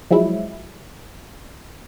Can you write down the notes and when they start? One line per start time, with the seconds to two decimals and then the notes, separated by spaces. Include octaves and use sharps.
0.11 F3 F#3 G#3 E4